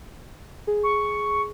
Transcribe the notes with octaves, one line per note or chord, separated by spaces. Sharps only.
G#4
C#6